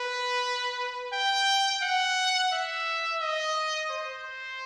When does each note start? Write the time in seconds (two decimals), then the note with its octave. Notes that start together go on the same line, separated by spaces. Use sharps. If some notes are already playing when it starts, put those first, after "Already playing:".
Already playing: B4
1.13 G5
1.82 F#5
2.52 E5
3.21 D#5
3.91 C5